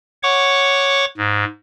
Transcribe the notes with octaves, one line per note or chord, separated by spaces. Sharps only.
C#5 F#5 C#6 D6
G#2